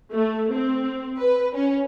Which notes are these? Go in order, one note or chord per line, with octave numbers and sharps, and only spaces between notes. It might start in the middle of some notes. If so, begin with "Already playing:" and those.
A3
C4
B4
C#4